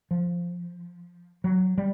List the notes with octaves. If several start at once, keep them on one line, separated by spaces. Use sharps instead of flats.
F3
F#3
G3